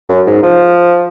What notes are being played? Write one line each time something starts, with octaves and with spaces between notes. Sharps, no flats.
F#2
G#2
F3